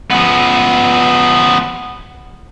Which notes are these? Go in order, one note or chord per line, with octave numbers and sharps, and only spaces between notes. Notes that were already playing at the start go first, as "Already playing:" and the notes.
F3 B3